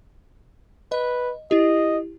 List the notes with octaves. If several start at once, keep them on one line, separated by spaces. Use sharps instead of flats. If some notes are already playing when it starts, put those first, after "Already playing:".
B4 D#5
E4 G4 D#5